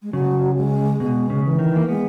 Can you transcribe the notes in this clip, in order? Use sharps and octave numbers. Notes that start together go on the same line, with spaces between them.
G#3
C#3 F#3
G#3
B2 G#3
C#3
E3
D#3
A#3
G#3 B3